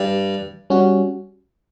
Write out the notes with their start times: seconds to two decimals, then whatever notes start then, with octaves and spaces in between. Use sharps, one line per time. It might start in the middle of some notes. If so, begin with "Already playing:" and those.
Already playing: G2
0.70 G3 C#4 F#4